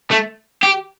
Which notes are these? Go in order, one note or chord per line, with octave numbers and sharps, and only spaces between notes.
A3
G4